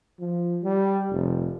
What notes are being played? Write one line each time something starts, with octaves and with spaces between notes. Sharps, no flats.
F3
G3
F1